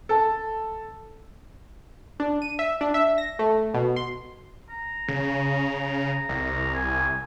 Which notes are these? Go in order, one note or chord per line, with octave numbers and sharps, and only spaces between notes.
A4 A5
D4
D#7
E5
D4
E5
A#6
A3
B2
C6
A#5
C#3
C2
G#5